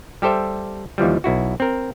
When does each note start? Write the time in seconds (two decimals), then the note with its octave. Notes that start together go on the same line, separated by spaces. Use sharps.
0.22 G3 G4 A4 C5 E5
0.98 D#2 E3 F3 G3
1.24 B1 E4 F#4
1.60 C4 A#4